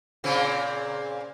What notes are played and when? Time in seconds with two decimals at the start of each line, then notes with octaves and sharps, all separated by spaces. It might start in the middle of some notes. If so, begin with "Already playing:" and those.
0.24 A#2 C#3 C4